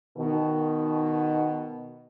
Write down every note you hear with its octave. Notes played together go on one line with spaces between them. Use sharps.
B2 D#3